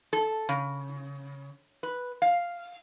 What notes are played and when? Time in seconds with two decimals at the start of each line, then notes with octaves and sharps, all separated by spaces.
0.13 A4
0.49 C#3
1.83 B4
2.22 F5